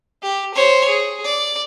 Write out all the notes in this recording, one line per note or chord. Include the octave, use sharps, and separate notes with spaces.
G4
C5 C#5
G#4
D5